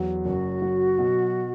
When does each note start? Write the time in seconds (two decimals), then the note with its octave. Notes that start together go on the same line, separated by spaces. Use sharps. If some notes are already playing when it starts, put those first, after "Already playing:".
Already playing: E2 F#3
0.25 F#1 F#4
0.62 F#3
0.99 B2